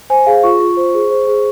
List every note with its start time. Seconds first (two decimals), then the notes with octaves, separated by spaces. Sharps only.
0.10 C5 G#5
0.26 G#4 F5
0.43 F4 C#6
0.60 F4
0.77 C5
0.94 G#4
1.11 C5
1.27 G#4